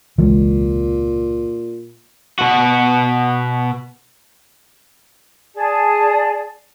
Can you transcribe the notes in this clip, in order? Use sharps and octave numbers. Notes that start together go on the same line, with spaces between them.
E1 C#2 A#2 E3 G#3
B2 F#4
G#4 D5 A5